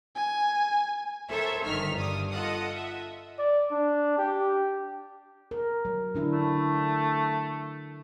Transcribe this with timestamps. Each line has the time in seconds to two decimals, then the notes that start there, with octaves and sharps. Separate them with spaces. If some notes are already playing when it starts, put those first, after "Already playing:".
0.15 G#5
1.30 A4 A#4 C5 C#5 E5
1.64 G1 D#3 F6 B6
1.95 G2 D4 D#6
2.32 F4 A4 D#5 F#5 D#6
2.75 E5
3.38 D5
3.71 D4
4.18 G4
5.51 A#4
5.85 F#3
6.15 D3 D4 E4
6.33 A3